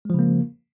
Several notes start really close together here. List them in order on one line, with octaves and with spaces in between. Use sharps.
G#3 F3 C#3 A#3